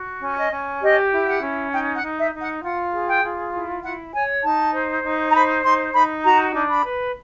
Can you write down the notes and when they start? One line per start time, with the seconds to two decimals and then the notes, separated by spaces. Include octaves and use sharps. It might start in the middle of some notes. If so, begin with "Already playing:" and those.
Already playing: F#4
0.22 C#4
0.37 D#5
0.52 C#4
0.82 G4 D#5
1.13 E4
1.28 F#5
1.43 C#4
1.72 D#4 G5
1.95 F#5
2.03 D#4
2.18 E5
2.33 D#4
2.40 F#5
2.63 F4 F#5
2.93 G#4
3.08 G5
3.23 F4
3.54 E4
3.83 E4 F#5
4.13 C#5 G#5
4.44 D#4 A5
4.74 C5
5.04 D#4
5.30 A#5
5.34 C5 B5
5.64 D#4 C6
5.94 D#4 B5
6.24 F#4 A#5
6.55 D4
6.70 B5
6.84 B4